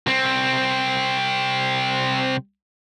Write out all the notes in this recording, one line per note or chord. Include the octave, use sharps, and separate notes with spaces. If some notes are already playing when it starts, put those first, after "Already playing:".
C2 C4